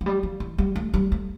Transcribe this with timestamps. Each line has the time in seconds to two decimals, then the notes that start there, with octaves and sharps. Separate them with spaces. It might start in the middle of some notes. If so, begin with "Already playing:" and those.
0.01 F3
0.06 G3
0.23 F3
0.40 E3
0.58 G3
0.76 A3
0.94 G3
1.12 A3